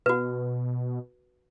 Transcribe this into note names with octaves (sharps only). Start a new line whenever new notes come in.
B2 F#4 B4